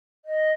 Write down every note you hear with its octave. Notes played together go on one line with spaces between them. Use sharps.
D#5